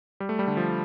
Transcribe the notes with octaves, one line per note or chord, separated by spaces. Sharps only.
G3
A3
G3
D3
F3